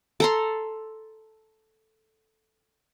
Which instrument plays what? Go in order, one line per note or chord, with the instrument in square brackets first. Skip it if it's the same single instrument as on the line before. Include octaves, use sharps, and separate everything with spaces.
[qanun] A4 A#5 C6